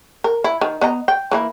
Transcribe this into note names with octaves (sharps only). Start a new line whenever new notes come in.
A#4
E4
D#3
B3 D#5 A#5
G5
E3 A#3 E4